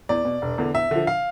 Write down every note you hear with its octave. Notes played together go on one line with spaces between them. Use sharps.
E2 D5
B2
E1
E2 D3
E2 E5
D3 F3
F5